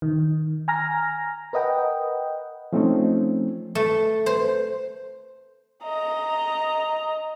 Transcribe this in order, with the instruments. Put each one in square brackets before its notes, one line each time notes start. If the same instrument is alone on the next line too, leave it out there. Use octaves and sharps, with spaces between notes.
[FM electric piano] D#3
G#5 A#5 F6 A#6
A#4 B4 D#5 F#5 G5
[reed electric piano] F3 A3 C4 C#4 D#4
[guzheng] A3
C5
[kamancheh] D#5 A#5